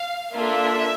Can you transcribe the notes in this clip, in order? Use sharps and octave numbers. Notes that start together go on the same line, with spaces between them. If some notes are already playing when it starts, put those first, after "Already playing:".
Already playing: F5
A#3 D4 F4 A4 E5